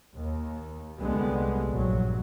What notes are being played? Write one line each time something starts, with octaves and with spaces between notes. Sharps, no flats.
D#2
C2 D3 G3 G#3 B3
A#1 G2 F#3